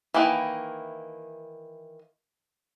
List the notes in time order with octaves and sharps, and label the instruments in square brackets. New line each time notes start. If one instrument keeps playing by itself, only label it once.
[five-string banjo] D#3 E3 A#3 E4